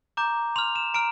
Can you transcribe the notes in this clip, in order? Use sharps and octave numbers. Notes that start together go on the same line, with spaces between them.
A#5 D6 G6
C6 F6 F7
E7
A#5 F6 D7